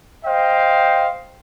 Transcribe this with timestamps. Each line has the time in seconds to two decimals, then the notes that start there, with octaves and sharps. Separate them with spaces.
0.25 C5 D#5 F5 G5